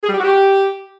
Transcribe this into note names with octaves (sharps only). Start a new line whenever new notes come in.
G#4
G3
G4
F#4
G4